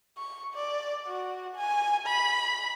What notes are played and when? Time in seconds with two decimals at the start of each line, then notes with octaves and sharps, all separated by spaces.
0.18 C#6
0.54 D5
1.07 F#4
1.56 G#5
2.07 B5